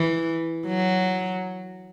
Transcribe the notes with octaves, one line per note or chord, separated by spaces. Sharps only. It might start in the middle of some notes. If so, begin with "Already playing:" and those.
Already playing: E3
F#3